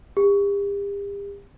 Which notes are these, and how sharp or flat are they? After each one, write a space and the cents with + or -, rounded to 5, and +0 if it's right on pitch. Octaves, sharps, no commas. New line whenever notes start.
G4 +40